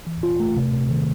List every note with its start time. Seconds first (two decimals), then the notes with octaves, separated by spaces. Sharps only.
0.07 E3
0.23 F4
0.40 A3
0.57 C3
0.73 C3
0.90 D#3